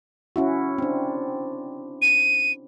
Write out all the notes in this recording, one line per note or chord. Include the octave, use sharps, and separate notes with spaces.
C#4 E4 F#4
C4 D4
D#7